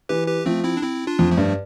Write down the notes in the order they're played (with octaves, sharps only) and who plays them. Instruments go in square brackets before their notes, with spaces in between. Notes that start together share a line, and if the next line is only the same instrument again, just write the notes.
[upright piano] E3 [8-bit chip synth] G4 B4
[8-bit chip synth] G4 B4
[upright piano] F3 [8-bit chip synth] A3 C4
[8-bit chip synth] C4 E4
D4
C4 E4
D4 F4
[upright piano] F2
[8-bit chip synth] F3 A3
[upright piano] G2